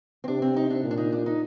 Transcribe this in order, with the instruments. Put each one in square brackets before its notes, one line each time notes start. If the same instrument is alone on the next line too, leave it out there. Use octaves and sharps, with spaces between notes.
[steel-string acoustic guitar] C4
[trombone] C3 [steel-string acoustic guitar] D4
[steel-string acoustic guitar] C4
D#4
D4
[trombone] A#2
[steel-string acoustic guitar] D4
D#4
D4
D#4